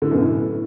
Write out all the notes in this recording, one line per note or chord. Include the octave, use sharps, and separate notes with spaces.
A2 D3
F#2 B2
A2